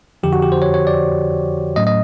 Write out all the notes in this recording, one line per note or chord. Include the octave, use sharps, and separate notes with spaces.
F2 D3 F3 G4
F#4
G4
C5
C#5
C#5
D5
A2 F#3 A3 C#4 D#5
D#5